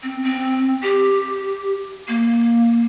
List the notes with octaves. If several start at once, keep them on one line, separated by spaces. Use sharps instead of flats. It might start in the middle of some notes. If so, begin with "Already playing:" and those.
C4
C4
G4
A#3